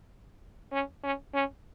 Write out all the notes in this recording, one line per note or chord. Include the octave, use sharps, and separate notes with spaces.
C#4
C#4
C#4